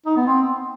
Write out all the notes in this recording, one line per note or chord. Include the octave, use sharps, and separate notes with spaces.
D#4
B3
C4